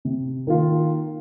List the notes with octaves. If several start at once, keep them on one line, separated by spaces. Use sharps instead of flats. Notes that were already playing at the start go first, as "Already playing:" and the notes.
C3
D#3 A#3 F4 A#4